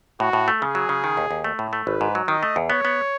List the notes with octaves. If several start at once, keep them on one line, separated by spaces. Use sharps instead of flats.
A2 F#4
A2
A3
C#3 G#4
F#3
C#3
D#3
D#2
D#2
A3
A2
A3
G#1 B4
G#2
F#3
D#3 D#5
A3
E2
B3 C#5
B3